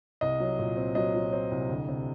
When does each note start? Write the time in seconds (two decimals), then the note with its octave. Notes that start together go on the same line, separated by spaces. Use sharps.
0.21 C2 D#5
0.40 F#3
0.59 A#2
0.77 C4
0.95 F#3 D#5
1.15 F#3
1.33 C4
1.51 C2
1.69 D2
1.88 C3